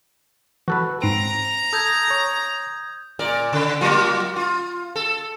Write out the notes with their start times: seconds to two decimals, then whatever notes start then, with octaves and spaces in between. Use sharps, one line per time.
0.68 E3 F#4 A4 B4 F#6
1.02 G#2 C4 A#5 C7 D7
1.73 A4 D#6 G6 G#6
2.10 C#5
3.19 A#2 A#4 D5
3.53 C#3
3.81 F#3 A#3 F4
4.36 F4
4.96 A4